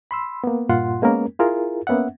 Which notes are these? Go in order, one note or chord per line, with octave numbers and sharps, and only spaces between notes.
B5 C6 E6
A#3 B3
G2 A#2 F4 F#5 C6
G#3 A#3 B3 C#4 A#4
E4 F4 G#4 A#4
A#3 B3 C#4 E5 F#5